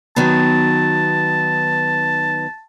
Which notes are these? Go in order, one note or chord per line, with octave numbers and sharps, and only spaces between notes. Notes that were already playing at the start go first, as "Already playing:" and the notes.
D#3 F#3 B3 A5